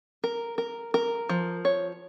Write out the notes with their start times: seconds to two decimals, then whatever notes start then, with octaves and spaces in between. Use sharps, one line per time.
0.24 A#4
0.58 A#4
0.94 A#4
1.29 F3
1.65 C#5